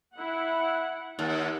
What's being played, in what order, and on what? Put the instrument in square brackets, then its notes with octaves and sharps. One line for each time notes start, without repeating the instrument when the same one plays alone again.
[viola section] E4 F#5
[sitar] D#2 [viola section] F#5